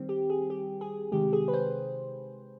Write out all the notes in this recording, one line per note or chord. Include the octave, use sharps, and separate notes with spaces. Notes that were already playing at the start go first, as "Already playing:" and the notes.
Already playing: D#3 G3 C4
G4
G#4
G4
G#4
C3 D#3 G#3 G4
G#4
B4
C5